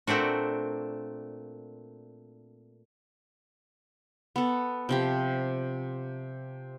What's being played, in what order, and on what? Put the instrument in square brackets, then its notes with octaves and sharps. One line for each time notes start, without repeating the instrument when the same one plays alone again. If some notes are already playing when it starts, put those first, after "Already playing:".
[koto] A#2 A3 C4 D4 F#4
[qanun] B3 A4
C3 F3 G4